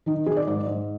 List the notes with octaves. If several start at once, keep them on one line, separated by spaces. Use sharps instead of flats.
D#3 D#4
D#3 G#4
D5
G#2 D5
G#2